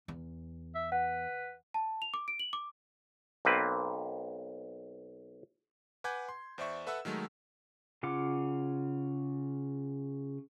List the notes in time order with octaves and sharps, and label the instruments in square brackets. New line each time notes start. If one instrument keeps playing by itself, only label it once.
[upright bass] E2
[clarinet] E5
[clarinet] B4 [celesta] F#5
[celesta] A5
F7
D6
D7
F#7
D6
[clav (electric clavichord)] B1 A#3 C4 B4
[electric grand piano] B4 F#5 G#5 D6 G6 G#6
C6
E2 C5 D5 E5 C#6
A4 B4 E5 F#5 E6
D#3 F#3 G#3 A3
[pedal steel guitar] C#3 F4 F#5 D6